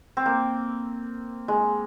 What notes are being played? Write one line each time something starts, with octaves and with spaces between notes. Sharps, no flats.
C4
A#3
G#3